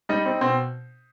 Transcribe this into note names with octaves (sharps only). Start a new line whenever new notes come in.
G3 D#4 D#5
C4
B2 C4 C5